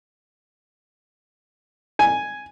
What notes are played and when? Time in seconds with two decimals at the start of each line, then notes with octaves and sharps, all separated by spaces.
1.99 G#5